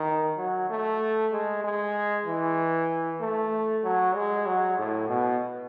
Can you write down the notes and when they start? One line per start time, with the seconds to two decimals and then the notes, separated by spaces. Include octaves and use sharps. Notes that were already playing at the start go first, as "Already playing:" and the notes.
Already playing: D#3
0.38 F#3
0.70 A3
1.33 G#3
1.64 G#3
2.26 E3
3.21 A3
3.84 F#3
4.15 G#3
4.46 F#3
4.78 A2
5.09 B2